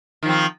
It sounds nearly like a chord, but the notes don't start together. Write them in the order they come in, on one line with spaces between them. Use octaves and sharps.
D#3 F3 C4